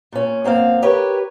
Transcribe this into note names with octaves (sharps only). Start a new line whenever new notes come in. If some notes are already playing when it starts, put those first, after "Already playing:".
A#2 C#4
F#2 A#3 C4 F5
G4 A#4 B4 C#5